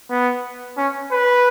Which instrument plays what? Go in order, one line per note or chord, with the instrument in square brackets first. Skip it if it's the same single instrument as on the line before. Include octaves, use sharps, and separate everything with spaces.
[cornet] B3
C#4
B4